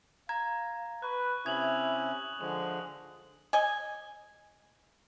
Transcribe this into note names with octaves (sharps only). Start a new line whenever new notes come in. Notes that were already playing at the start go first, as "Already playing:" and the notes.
F5 A#5 G#6
B4 C#6 F#6
C3 C#4 E4 D#6 G#6 F7 F#7
D3 F3 G#3 F7
D#5 G#5